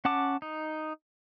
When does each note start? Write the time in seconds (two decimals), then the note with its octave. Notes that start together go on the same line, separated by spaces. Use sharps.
0.05 C#4 F#5 A5 D6
0.42 D#4